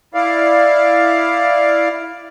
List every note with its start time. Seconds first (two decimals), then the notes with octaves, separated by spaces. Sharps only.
0.14 E4 D5 F5